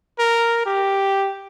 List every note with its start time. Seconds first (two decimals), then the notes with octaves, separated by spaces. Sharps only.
0.19 A#4
0.66 G4